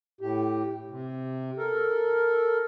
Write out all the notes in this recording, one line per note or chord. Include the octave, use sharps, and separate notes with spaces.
A2 G4
C3
A4 A#4